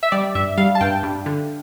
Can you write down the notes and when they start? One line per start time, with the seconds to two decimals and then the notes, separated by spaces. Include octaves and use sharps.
0.03 E5
0.12 G3 D5
0.35 G2 E5
0.58 G3 F5
0.75 A5
0.81 G2 G5
1.03 G2
1.26 D3